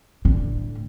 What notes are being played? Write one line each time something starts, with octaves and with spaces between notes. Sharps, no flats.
A2 D3